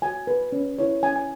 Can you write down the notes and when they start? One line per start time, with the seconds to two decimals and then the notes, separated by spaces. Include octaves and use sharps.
0.02 F#4 G#5
0.27 B4
0.52 C#4
0.79 E4 C#5
1.03 C#4 G#5
1.16 G#5